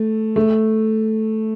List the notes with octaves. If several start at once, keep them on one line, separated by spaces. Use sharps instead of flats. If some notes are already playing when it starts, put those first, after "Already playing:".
Already playing: A3
A3